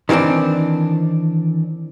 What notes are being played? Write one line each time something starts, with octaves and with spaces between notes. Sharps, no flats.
D#3 E3 G3 C4 D4